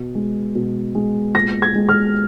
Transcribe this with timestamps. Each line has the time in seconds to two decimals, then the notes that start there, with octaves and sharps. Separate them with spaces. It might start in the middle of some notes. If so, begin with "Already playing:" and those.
Already playing: B2
0.15 G#3
0.55 B2
0.95 G#3
1.35 A#2 A#6
1.62 G#6
1.75 G#3
1.89 F6